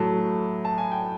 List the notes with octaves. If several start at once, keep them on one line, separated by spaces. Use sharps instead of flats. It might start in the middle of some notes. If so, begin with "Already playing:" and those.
Already playing: A2 F#3 A3 A5
A5
G#5
G5